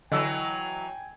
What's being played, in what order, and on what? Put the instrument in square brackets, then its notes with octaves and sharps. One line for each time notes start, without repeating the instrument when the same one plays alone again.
[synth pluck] D3 [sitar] E3 F#3 [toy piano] D#5 E6 [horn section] G5 G#5